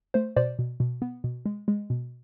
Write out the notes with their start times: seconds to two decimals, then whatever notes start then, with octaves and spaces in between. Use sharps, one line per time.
0.14 A3 C5
0.36 B2 C5 D5
0.59 B2
0.80 B2
1.02 B3
1.24 B2
1.46 G#3
1.68 G#3
1.90 B2